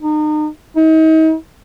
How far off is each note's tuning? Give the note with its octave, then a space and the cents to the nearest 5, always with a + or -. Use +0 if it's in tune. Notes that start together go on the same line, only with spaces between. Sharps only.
D#4 -35
D#4 +40